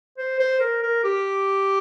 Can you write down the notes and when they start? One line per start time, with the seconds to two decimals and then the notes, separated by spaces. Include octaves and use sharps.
0.18 C5
0.40 C5
0.60 A#4
0.82 A#4
1.04 G4